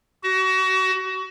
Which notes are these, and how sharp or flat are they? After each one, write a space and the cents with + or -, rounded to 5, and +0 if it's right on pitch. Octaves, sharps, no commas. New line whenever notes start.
F#4 +30